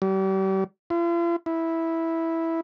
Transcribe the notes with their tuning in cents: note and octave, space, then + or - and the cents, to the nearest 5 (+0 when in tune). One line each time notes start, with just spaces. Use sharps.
G3 -35
F4 -45
E4 -5